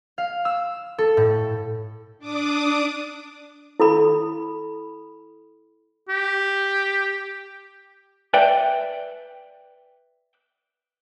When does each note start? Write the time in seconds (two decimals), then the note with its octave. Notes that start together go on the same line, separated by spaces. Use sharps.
0.18 F5
0.45 E6
0.98 A4
1.17 A2
2.19 D4 D6 D#6
3.80 E4 A4 B5
6.09 G4
8.34 B4 D5 E5 G5